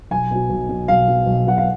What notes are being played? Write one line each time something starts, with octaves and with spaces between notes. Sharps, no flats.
B1 G#5
B2 F#3
B1
B2 F#3
B1 F5
B2 F#3
B1
B2 F#3 F#5
F5